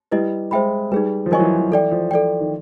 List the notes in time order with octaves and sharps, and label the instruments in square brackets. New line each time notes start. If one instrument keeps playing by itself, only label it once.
[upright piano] G3 [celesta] E4 G4 B4 D#5
[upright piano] G#3 [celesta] C5 E5 G5 B5
[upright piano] G3 [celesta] D#4 G#4 B4
[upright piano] F3
[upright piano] F#3 [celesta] A#4 D#5 G#5 C#6
[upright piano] E3
F3
E3
[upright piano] E3 [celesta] A4 D5 G5
[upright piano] F3
[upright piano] F3 [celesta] A4 D5 G5
[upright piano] D#3